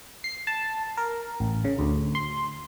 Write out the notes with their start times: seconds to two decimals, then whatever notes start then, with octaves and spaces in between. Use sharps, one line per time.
0.24 C7
0.47 A5
0.97 A#4
1.40 A1
1.64 C#3
1.79 D2
2.15 C6